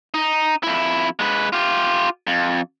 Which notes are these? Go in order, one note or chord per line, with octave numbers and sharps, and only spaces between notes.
D#4
F2 E4
G#3 B4
F4 G4
F2